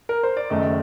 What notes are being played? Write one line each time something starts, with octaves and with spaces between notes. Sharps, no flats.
A#4
C5
D5
F#1 F#2 D#3 A3 D#5